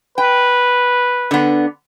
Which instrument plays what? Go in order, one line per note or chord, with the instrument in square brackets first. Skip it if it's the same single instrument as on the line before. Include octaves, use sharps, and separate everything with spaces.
[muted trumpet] B4 [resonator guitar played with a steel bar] G5
[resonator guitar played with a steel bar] D3 B3